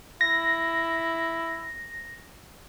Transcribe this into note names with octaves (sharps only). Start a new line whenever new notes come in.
E4 A#6